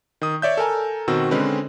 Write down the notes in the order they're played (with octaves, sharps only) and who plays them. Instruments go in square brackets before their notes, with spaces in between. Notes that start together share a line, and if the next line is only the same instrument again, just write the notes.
[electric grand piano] D#3 D#6
C#5 D5 E5 G6
A4 A#4 G#5 A#5
B2 D#3 C4 F#4 E6
D3 G#3 C4 C#4 B4